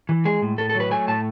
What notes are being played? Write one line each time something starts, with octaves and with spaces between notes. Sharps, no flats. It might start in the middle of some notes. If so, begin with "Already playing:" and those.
E3
G#3 G#4
A2
A2 A4
A4
F#3
B4
A3 G#5
A2 A5